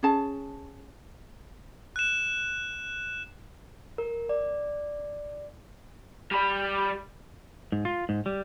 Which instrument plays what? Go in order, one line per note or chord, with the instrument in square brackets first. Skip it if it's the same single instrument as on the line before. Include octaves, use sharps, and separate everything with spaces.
[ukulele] C#4 G#4 A5
[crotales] F#6 E7
[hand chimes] A#4
D5
[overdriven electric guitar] G3 B5
[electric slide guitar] G#2
F4
G#2
G3